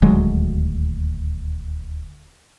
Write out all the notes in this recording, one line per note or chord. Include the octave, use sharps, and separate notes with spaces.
D#1 D2 F#3 G#3